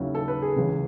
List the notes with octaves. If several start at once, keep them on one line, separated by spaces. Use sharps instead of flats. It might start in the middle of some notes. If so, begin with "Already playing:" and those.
Already playing: D#2 C#3 F#3 C#4 E4
A4
B4
G#4
C#2 C#3 E3